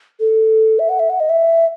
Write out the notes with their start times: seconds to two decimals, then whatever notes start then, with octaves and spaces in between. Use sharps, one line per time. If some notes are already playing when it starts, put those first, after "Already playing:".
0.20 A4
0.79 E5
0.89 F#5
0.99 E5
1.10 F#5
1.20 D#5
1.29 E5